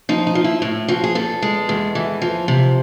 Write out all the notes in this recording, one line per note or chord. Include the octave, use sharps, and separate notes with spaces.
F3 D#4
D#4
F3
E4
A2
F3 F#4
G#4
E2 A4
G#3
E2
E3
F3
C3